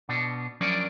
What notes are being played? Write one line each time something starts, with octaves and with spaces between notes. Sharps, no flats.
B2 B3 D4
F3 F#3 C#4 D4 A#4 D5